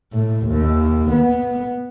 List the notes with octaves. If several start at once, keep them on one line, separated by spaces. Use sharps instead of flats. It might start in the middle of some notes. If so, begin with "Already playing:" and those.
A2
D#2
B3